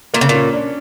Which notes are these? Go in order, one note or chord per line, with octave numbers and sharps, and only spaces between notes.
A#2 A#3
C#3
A#2 C#4
D4